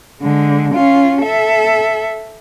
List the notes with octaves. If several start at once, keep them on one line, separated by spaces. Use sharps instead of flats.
D3 G#3
C#4 F4
A4 E5